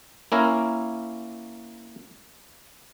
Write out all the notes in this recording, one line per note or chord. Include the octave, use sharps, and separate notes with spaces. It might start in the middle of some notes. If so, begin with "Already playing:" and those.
A#3 C#4 E4 A#4